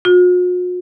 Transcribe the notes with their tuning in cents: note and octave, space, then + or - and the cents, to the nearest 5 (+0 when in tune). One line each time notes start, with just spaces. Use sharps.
F#4 -45